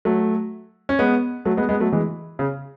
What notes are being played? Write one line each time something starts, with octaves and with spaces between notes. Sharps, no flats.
F#3 A3
C#4
G#3 B3
F#3 A3
G#3 B3
G#3 B3
F#3 A3
E3 G#3
C#3